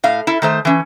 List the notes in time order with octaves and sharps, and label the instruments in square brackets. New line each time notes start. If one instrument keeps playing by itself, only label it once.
[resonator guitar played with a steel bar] A2 F5
E4 A4
D#3 A3 C5
E3 C#4